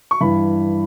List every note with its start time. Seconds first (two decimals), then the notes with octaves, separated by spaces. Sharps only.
0.11 C#6
0.21 G2 E3 B5